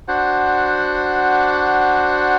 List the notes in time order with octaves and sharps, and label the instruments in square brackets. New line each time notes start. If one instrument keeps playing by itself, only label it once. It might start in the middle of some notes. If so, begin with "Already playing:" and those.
[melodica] D4 F#4 C5 F#5